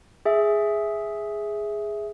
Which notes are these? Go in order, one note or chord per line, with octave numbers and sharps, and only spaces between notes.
G#4 E5